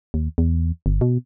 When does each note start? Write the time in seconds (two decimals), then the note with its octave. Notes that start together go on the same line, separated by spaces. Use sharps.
0.14 D#2
0.38 E2
0.86 G1
1.01 B2